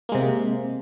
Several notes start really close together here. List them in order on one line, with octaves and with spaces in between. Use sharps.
A#3 G#3 C3